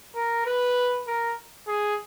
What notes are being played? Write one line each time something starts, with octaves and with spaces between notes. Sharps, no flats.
A#4
B4
A#4
G#4